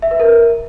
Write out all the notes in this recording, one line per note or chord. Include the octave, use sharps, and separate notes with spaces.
E5
B4
A#4